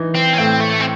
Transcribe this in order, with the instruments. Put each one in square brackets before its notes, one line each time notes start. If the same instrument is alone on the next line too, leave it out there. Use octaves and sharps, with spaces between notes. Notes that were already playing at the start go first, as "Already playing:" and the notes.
Already playing: [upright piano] E3 D#4
[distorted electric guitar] C4
C#4
[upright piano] A2 [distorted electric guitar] C4
[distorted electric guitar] A3
C4